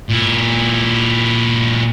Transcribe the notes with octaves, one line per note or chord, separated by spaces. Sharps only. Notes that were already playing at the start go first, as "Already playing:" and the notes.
A#2 E4